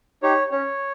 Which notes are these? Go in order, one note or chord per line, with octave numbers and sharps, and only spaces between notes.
D#4 G4 C#5
C#4 C#5